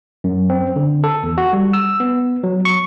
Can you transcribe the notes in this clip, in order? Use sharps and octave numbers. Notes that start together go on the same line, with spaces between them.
F#2
C4
D3
A4
E2
F#4
G3
E6
B3
F#3
C#6